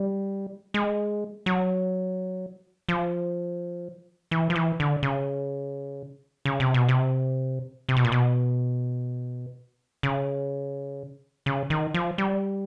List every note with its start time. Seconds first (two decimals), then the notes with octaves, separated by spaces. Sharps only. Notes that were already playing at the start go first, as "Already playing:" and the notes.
Already playing: G3
0.74 G#3
1.46 F#3
2.89 F3
4.31 E3
4.50 F3
4.55 E3
4.80 D3
5.03 C#3
6.45 C#3
6.60 C3
6.74 B2
6.88 C3
7.89 C3
7.97 B2
8.04 A#2
8.12 B2
10.03 C#3
11.46 C#3
11.70 D#3
11.94 F3
12.18 G3